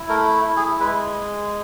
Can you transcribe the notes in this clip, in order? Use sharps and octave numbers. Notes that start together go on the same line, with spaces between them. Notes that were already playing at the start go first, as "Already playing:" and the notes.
Already playing: E4
A3 A#4
E4
G#4
G#3 B4